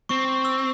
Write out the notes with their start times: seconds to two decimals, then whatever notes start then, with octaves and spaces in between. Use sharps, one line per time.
0.09 C4 C#6
0.45 E6